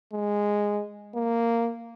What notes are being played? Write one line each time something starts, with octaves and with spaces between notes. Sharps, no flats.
G#3
A#3